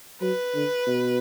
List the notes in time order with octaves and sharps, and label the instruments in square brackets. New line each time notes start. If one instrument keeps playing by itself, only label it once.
[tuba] F#3 [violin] B4
[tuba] D3
B2